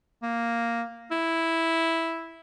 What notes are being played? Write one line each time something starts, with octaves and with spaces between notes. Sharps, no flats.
A#3
E4